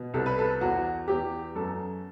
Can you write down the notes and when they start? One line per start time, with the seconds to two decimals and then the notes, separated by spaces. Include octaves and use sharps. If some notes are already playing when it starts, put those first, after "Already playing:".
Already playing: B2
0.14 C2 A4
0.26 B4
0.39 A4
0.61 E2 F#4
1.08 E2 G4
1.55 F#2 A4